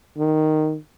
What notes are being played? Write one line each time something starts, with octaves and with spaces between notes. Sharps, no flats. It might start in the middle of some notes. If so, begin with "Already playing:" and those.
D#3